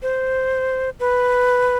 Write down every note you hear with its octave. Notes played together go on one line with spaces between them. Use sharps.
C5
B4